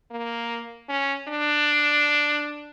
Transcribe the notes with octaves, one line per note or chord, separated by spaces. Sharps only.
A#3
C#4
D4